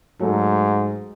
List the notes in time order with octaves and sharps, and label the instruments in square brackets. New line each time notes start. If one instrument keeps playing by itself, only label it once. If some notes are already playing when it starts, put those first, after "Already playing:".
[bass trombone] G#2 [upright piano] F#3 A3